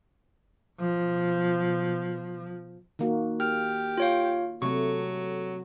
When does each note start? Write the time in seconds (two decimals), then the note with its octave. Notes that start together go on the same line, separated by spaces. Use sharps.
0.80 B2 F3
2.99 D#3 A#3 F#4
3.40 G4 F6
3.98 F4 C#5 F5
4.62 C3 F#3 A3 C#6